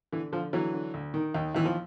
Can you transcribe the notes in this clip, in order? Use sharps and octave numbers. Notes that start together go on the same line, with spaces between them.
D3 E3
D3 F3
D3 E3 F#3
D3
D2
D#3
D#2
D#2 E3
F3